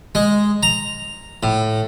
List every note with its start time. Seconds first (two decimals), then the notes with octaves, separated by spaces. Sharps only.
0.15 G#3
0.63 A#5
1.43 A2